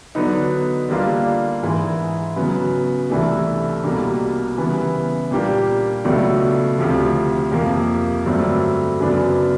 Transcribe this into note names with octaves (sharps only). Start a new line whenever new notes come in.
D3 F#3 B3 D#4
D3 G3 A#3 D4 F4
G#2 E3 G#3
C#3 F#3 B3
C2 C3 E3 A3 D4
C2 B2 G3 A#3 D4
C#3 E3 G3 B3
A#2 G3 A#3 D4 G4
C#2 B2 F#3 A3 D4
D2 C3 F3
F2 C3 F3 A#3
G2 D3 F#3 A3 C4
F#2 C#3 F#3 B3 D4